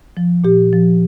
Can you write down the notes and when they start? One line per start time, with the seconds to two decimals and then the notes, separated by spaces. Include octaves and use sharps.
0.17 F3
0.44 A#2 G4
0.73 F3